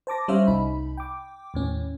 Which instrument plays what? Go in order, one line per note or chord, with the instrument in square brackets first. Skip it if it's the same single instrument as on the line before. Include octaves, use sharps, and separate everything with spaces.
[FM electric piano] C5 A5 D6 A#6
G3 C#4 C5 C#5 E5 F5
C2 D#4 B5
G5 D6
D#2 A2 C#4